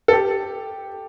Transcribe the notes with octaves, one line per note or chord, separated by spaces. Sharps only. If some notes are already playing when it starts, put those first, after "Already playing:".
A4
G4